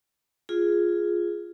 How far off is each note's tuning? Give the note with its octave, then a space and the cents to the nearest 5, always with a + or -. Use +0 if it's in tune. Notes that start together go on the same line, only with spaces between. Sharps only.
F4 +0 G#4 +0